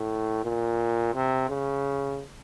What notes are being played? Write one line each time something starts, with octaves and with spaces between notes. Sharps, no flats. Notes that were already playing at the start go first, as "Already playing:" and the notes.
Already playing: A2
A#2
C3
C#3